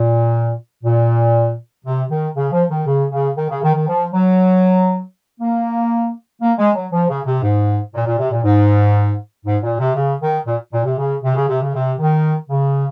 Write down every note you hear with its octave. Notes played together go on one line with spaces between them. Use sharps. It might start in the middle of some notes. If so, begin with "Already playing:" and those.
Already playing: A#2
A#2
C3
D#3
C#3
F3
D#3
C#3
C#3
D#3
C#3
D#3
D#3
F3
F#3
A#3
A#3
G#3
F#3
F3
C#3
C3
G#2
A#2
A#2
C3
A#2
G#2
G#2
A#2
C3
C#3
D#3
A#2
A#2
C3
C#3
C3
C#3
C3
C#3
C3
D#3
C#3